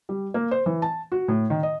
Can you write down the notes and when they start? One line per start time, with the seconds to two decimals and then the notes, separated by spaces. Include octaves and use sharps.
0.09 G3
0.34 A#3
0.51 C5
0.66 E3
0.82 A5
1.12 F#4
1.28 A2
1.50 D#3
1.63 D#5